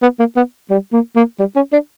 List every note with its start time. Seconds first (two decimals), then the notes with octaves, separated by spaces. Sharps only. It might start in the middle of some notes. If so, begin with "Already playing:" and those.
0.02 B3
0.19 A#3
0.37 B3
0.70 G3
0.93 A#3
1.16 A#3
1.39 G3
1.56 C#4
1.73 D4